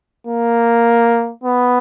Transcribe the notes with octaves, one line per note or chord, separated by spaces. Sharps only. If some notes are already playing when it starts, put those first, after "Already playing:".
A#3
B3